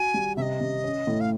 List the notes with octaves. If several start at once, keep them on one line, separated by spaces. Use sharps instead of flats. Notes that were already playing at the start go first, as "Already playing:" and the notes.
Already playing: F#4 G#5
G3
C3 D#5 E5
C3
C#4
A2
F5